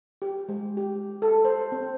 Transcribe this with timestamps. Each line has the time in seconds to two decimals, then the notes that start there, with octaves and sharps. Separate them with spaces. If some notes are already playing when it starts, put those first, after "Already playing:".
0.22 G4
0.49 G#3
0.77 G4
1.22 A4
1.45 C5
1.72 C4